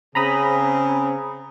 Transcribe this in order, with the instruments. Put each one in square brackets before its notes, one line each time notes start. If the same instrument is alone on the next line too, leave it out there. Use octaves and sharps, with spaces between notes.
[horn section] C#3 C4 G#4 [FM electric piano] A#5 B5 D#6